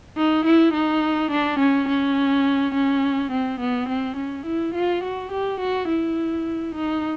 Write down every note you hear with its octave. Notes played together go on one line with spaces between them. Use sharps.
D#4
E4
D#4
D4
C#4
C#4
C#4
C4
B3
C4
C#4
E4
F4
F#4
G4
F#4
E4
D#4